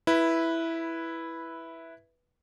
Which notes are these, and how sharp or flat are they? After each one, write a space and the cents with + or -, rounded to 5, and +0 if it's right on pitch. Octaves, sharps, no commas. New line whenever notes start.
E4 +0 B4 -10